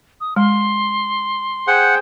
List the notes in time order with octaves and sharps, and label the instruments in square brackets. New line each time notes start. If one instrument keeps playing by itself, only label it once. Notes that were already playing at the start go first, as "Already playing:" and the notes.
[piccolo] D#6
[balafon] G#3 [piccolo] C6
[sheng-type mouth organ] G#4 C5 G5 [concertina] F#5